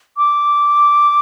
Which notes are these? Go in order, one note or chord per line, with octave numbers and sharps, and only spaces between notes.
D6